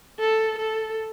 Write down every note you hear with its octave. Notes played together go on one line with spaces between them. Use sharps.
A4
A4